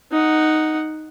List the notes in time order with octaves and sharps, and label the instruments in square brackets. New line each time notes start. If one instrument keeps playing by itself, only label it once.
[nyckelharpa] D#4 F#5